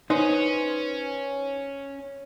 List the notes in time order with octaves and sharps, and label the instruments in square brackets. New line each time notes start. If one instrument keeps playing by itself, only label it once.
[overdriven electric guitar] C#4 [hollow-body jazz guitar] D#4 B4 C5